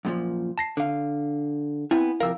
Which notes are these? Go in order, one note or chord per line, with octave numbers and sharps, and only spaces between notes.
F#2 A#2 F3
A5 A#6 C7
D3 F5
B3 C4 E4 G#5
C3 F3 A#4 F5 E6